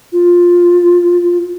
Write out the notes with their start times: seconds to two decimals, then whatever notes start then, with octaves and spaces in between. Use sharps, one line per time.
0.12 F4